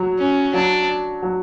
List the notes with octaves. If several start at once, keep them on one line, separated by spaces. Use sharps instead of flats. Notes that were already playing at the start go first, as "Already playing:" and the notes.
Already playing: F#3
C#4
F#3 D4
F#3